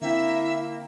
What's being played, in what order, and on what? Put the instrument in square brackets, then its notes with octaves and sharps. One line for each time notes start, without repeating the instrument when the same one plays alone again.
[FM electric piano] D3 C4 G5 [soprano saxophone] A#3 [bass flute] E4 [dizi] E5